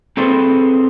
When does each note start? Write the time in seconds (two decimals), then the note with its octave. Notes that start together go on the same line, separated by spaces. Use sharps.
0.17 C4 E4 G#4 A4 B4 C5